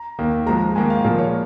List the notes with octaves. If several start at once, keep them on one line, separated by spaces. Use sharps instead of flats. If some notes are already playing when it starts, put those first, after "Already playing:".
Already playing: A#5
D#2 D#3 A#3
G#2 F3 G#3 A#5
G#2 D#3 A#3 G#5
F5
A#2 F3 G#3 A#4
C#5